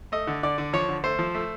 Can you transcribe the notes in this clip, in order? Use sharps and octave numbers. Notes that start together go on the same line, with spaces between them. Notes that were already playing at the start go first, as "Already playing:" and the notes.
A3 D#5
D3
D3 D5
D3
F3 C#5
D3
A3 C5
F3
A3